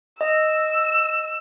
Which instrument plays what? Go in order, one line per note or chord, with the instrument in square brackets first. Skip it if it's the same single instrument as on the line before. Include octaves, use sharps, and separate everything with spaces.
[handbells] D#5 [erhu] E6